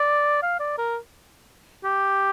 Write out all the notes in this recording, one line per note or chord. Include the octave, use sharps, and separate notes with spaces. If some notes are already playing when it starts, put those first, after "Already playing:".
Already playing: D5
F5
D5
A#4
G4